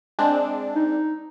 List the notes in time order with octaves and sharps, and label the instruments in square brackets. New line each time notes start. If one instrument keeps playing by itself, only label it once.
[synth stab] G#3 C4 D4
[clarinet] D#4